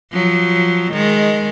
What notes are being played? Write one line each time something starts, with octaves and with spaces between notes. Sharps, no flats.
F3 F#3
D#3 G#3